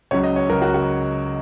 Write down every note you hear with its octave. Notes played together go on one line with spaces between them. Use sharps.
C#2 C#3 F#3 C#5
D#5
C#5
C#2 C#3 F#3 A#4
F#4
F#4